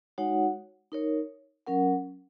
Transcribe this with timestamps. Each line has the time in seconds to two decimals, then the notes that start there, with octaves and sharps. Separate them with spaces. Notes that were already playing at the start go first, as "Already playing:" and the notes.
0.18 G#3 D#4 F#4 C#5 F#5
0.92 D#4 A#4 C#5
1.67 F#3 C#4 A#4 F#5